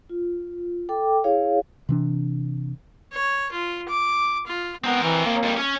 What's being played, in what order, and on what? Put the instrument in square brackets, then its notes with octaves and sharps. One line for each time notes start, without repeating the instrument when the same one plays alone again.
[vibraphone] F4
A4 G5 D6
E4 G#4 C#5 F5
[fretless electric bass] C3 E3 D4
[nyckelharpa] C#5
F4
D6
F4
[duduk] B3 [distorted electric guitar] C4 A#4
[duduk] E3
A#3
[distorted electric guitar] F2 G3
C#4